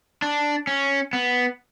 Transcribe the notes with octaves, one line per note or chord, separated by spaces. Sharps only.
D4
C#4
B3